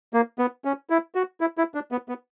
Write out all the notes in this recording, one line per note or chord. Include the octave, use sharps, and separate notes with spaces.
A#3
B3
C#4
E4
F#4
E4
E4
D4
B3
B3